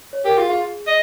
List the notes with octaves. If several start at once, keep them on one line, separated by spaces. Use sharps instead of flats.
C#5
G4 A#4
F4 G#4
F4 G#4
D#5